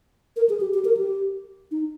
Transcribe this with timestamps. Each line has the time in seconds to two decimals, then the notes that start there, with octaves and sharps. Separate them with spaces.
0.36 A#4
0.49 G#4
0.60 G4
0.74 G4
0.85 A#4
0.97 G4
1.71 D#4